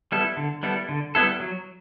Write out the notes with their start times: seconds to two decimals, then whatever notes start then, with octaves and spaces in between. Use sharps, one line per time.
0.12 G3 B3 E4 A4
0.37 D3
0.63 G3 B3 E4 A4
0.89 D3
1.15 G3 B3 E4 A4
1.40 F#3